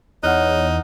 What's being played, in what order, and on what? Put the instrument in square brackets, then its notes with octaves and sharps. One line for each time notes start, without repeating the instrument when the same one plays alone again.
[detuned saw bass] E2 [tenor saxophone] D#4 [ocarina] C#5 [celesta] F#5 F6 F#6